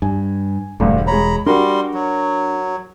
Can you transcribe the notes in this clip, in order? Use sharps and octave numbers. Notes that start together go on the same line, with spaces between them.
G2 G#5
E1 D2 G2 D3
G#3 C#5 A#5 B5
G3 D4 F#4 A#4 C6
F#3